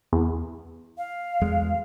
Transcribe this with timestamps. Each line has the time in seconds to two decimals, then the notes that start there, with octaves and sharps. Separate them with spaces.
0.13 E2
0.98 F5
1.41 E2 G#3